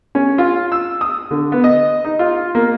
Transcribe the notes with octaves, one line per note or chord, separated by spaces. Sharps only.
C#4
F4
E6
D#6
D3
B3
D#5
D#4
F4
A#3